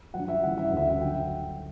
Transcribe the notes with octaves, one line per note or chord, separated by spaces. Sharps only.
G2 F#3 F#5
E5
F#2 C#3 E3 G3 F#5
E5
D2 C#3 G3 E5
F#5
D3 F#3 G5